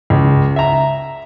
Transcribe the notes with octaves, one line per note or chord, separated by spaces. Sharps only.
C#2
E5 A#5